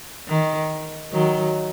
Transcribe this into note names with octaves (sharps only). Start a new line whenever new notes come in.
D#3
D#3 F#3